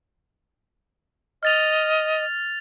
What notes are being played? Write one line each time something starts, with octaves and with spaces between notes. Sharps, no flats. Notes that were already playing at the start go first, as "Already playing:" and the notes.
D#5 F6 A6 F7